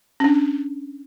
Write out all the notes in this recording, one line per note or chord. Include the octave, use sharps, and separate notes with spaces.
C#4 D4